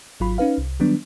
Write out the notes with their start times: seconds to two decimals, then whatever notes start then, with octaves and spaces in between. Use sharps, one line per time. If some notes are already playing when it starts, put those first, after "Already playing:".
0.20 G#1 F#3 F4 B5
0.38 C#4 D#4 B4 F5
0.58 C2
0.80 D#3 F#3 G3 B3 D4